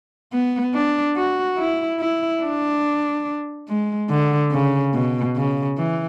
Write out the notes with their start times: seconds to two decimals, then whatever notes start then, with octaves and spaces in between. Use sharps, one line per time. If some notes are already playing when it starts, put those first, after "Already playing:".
0.33 B3
0.74 D4
1.17 F#4
1.58 E4
2.00 E4
2.42 D4
3.68 G#3
4.10 D3
4.51 C#3
4.94 B2
5.36 C#3
5.78 E3